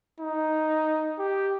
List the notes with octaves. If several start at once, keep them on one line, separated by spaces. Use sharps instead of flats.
D#4
G4